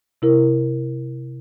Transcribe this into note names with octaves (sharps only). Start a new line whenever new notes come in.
C3 E4 A#4